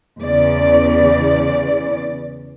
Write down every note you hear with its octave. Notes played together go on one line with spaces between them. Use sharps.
E2 C#3 D5